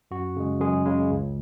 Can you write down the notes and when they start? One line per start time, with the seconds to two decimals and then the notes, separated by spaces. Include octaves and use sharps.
0.11 F#2 F#4
0.37 C#3 G#3
0.60 F#2 G#3 G#4
0.85 C#3 G#3
1.10 C#2